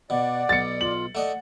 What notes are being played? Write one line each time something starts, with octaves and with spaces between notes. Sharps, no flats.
B2 D5 F#5
B1 A6 C#7
F4 F#7
A3 D5 D#5 F#5